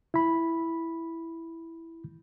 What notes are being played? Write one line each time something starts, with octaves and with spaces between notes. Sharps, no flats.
E4 B5